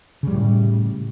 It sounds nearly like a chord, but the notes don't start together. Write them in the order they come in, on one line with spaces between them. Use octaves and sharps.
C#3 G3 A2